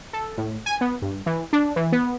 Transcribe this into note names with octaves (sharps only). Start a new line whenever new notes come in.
A4
A2
G#5
B3
G2
E3
D4
E3
B3